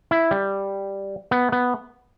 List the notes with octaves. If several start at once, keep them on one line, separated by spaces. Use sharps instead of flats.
E4
G3
B3
B3